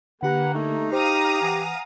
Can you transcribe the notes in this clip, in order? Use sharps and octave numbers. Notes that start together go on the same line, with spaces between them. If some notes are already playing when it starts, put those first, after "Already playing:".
D3 A#3 G4 B4 F#5 A#5
A3 D#4
G4 C5 F5 A#5 D#6
E3 F#5 G#5